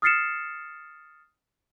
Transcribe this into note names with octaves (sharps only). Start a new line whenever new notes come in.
D#6 F6 A6 C7 C#7 E7